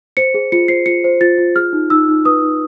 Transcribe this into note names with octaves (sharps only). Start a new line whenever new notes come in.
C5 C#7
G#4
F4 C#7
C5 C7
F4 C#7
C5
F4 A6
F4
G#4 F6
D#4
D#4 E6
D#4
B4 D#6
D#4